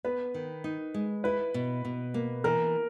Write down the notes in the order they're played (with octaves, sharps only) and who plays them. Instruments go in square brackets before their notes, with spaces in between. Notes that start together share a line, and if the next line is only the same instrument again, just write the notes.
[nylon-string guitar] B3 [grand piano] B4
[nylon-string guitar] D#3
D#4
G#3
[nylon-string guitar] E4 [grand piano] B4
[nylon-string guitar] B2
B2
A#3
[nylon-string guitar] E3 [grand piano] A#4